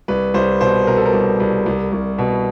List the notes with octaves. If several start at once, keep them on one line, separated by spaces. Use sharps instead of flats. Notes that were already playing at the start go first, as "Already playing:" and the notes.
C2 B4
C2 C5
B2 C5
B2 A#4
A4
A#4
C2
C2
C2
C2
B2